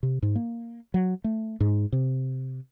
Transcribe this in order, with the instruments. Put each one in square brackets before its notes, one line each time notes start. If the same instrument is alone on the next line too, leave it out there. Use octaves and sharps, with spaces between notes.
[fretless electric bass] C3
G#2
A#3
F#3
A3
G#2
C3